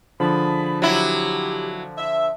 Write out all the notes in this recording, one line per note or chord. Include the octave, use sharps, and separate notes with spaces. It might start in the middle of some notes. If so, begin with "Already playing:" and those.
D3 F3 G#4 A5 B5
F#3 E4 G4
E5